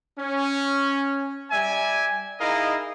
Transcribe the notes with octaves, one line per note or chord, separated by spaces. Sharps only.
C#4
G3 D5 E5 G#5
D#4 E4 G#4 A#4 D#5 F5